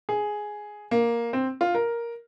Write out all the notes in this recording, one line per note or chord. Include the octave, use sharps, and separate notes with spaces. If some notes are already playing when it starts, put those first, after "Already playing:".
G#4
A#3
C4
F4
A#4